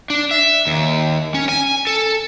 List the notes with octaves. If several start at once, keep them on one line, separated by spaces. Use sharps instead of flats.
D4
E5
D#2
C#4
G#5
A4